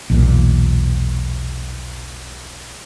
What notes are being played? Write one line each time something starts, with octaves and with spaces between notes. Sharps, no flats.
B1 E2 A#2